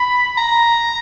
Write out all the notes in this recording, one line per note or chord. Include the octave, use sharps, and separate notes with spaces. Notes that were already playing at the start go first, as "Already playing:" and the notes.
Already playing: B5
A#5